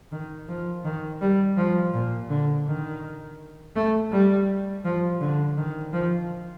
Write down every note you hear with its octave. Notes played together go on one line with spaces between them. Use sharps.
D#3
F3
D#3
G3
F3
A#2
D3
D#3
A3
G3
F3
D3
D#3
F3